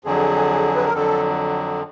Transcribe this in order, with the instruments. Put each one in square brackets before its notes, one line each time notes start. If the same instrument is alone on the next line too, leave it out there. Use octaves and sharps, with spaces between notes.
[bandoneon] F2 D3 F#3 [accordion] G#4
[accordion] B4
A#4
[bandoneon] F2 D3 F#3 [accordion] A4